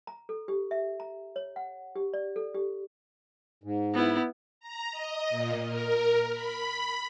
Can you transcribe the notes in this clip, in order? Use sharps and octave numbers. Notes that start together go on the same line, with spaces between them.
A#5
A4
G4
E5
A#5
C#5
F#5
G4
D5
A4
G4
G#2
B3 E4
A#5
D#5
A#2
A#4
B5